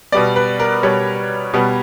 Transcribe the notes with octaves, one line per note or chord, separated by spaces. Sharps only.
B2 G3 B3 D5
B4
A#4
B2 G3 B3 C#5
B2 G3 B3